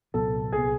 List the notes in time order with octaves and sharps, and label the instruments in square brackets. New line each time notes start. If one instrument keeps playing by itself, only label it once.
[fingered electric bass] C2 A#2 F#3 B3 [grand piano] A4
[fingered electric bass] C2 A#2 F#3 B3 [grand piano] G#4